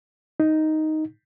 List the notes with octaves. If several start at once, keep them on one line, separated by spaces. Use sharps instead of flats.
D#4